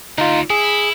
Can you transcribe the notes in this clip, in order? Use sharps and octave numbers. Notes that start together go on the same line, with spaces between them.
D2 D#4 F4
E4 G#4